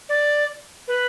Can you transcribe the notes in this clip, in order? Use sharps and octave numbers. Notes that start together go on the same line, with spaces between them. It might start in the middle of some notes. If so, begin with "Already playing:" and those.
D5
B4